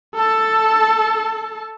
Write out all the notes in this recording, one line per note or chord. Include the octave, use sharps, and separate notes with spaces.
A4 A5